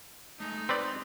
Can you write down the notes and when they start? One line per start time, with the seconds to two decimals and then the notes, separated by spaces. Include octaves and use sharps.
0.40 G#3 A3 D#4
0.69 C4 B4 D5 C6